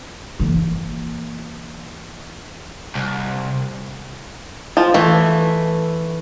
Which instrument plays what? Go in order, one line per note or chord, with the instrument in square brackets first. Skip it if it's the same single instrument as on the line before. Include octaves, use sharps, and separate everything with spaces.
[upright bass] E3 A#3
[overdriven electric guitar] C2
[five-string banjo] F3
[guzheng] E3 [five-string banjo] A3